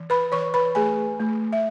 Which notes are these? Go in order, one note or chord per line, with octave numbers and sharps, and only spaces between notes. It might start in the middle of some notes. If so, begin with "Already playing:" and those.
Already playing: E3
B4 B5
E3 C#5 C#6
B4 B5
A3 G#4 G#5
A3
E5